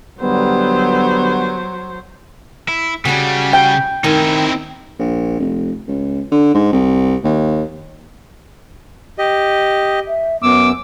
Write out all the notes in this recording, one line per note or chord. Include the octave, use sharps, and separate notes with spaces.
D3 F#3 G3 B3 C5
E4
C#3 G3 F#4 G#4
G5
D#3 C4 D#4 E4 G#5
A#1
F1
C#2
D3
G#2
C2
D#2
G4 D#5
E5
F#2 B3 D6 E6